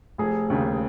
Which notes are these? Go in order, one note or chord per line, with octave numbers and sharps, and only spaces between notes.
F1 G#4
D#2 C#3